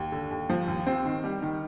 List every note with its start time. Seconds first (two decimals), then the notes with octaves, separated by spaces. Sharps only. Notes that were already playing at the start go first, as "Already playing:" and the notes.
Already playing: D#2
0.12 D3
0.31 D#2
0.49 F3
0.68 D#2
0.87 C4
1.05 D#3
1.24 G3
1.42 D#3